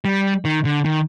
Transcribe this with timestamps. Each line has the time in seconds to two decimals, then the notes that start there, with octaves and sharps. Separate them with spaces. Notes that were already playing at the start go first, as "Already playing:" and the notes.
0.05 G3
0.45 D#3
0.65 D3
0.85 D#3